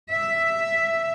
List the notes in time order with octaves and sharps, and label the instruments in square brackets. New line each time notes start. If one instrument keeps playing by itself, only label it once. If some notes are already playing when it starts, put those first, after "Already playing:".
[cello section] E5